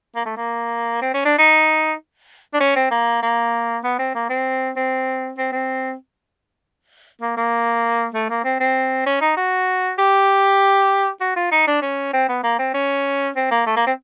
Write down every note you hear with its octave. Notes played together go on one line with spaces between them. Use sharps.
A#3
A3
A#3
C4
C#4
D4
D#4
D4
C#4
C4
A#3
A#3
B3
C4
A#3
C4
C4
C4
C4
A#3
A#3
A3
A#3
C4
C4
C#4
D#4
F#4
G4
F#4
F4
D#4
D4
C#4
C4
B3
A#3
C4
C#4
C4
A#3
A3
A#3
C4